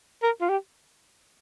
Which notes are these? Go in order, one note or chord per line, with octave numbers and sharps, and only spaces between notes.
A#4
F4
G4